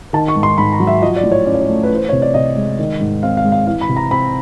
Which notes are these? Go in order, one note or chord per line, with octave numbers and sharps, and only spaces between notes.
D#3 A5
C#6
G#2
C6
G#2 B5
A#5
F#3
E5
F3 D#5
D5
A2
C#5
C#4 D5
C#5
D5
A3
B4
E3 C5
C3 C#5
D5
C3 D#5
G#3
D#3
G#2
C4 F5
F5
G#3
F5
E3 F5
B5
C3
A#5
C4 B5